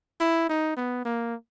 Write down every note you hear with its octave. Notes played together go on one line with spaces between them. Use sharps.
E4
D#4
B3
A#3